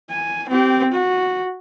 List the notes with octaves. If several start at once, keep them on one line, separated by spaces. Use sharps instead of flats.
G#5
C4 G4
F#4